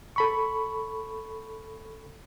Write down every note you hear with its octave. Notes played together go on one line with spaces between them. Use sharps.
A4 B5 C#6